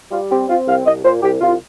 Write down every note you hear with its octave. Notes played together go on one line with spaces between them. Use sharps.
G3 F4
C4 G4
C4 F4
C2 F5
C2 D#5
A#2 C5
C2 G4
C2 F4